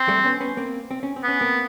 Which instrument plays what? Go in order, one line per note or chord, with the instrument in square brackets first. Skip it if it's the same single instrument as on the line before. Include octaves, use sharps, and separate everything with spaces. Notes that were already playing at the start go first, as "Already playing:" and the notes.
Already playing: [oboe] C4
[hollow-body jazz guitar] G3 A3
B3 C#4
B3 C#4
A#3 C4
C4
C#4
C4
[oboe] B3 [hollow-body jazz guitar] C#4
[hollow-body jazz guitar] A#3 C4